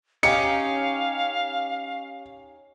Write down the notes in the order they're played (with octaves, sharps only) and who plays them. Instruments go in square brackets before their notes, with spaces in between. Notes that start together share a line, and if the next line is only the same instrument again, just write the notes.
[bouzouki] C#4 D#4 G4 [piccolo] F5 [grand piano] C#7